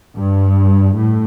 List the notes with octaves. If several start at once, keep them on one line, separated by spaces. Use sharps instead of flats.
G2
A2